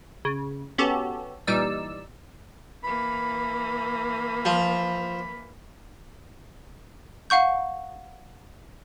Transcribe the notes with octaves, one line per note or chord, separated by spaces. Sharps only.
C#3
B3 C#4 F#4 G4 A4
A#2 E3 G3 D#4 D5 E6
E3 A#3 B5
F3
F5 F#5 C#6 G6